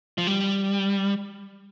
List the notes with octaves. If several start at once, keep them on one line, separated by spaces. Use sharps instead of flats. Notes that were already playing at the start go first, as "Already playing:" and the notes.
F3
G3